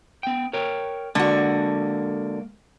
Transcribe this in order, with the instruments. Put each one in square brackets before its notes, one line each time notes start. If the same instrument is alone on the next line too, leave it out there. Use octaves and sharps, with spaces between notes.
[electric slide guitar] B3 G5
A#4 C#5 G5
[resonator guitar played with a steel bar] D3 F#4 [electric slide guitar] G#3 A#3 A4